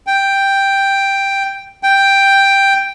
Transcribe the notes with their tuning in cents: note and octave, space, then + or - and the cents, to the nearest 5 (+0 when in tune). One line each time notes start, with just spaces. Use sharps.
G5 +5
G5 +5